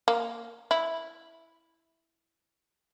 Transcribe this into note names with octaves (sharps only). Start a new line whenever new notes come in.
A#3
E4